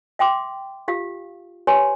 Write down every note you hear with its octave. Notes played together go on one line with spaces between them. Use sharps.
E5 G5 C6 D6
F4 G4 F5
G4 B4 C#5 G#5 C6